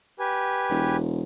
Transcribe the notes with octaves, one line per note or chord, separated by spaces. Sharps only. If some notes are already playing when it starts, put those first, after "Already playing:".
G4 B4 G#5
E1